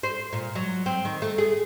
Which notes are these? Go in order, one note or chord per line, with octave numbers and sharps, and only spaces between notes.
C5
A#2
F#3
C4
D#3
A3
G#4